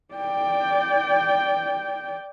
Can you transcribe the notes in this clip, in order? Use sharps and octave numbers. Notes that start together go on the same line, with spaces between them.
D5 G5